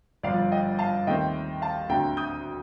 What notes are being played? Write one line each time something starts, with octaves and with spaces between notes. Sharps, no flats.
G1 G2 F3 D5 F5
D#5 G5
F5 A5
D#2 D#3 A3 C4 D#5 G5
F5 A5
D2 D3 A3 C4 G5 A#5
D#6 G6